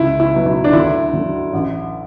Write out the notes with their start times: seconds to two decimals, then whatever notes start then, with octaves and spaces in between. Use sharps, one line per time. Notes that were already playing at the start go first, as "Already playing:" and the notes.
Already playing: C#2 E4
0.20 E4
0.33 B2 F#3
0.46 E4
0.64 D4
0.73 D2 E4
1.13 D3 F#3
1.53 A1